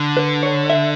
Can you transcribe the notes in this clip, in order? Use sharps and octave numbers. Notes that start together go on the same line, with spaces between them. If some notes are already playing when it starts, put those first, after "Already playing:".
Already playing: D3
B4
C#5
E5